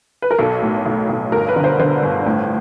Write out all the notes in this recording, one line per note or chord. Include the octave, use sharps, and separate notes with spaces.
B4
A#4
B1 A4
A2
B1
B1
G1 A#4
B4
D3
C5
D3 C5
G1
A2